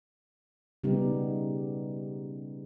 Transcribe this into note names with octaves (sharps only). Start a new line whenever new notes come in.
C#3 G3 B3 D#4 G4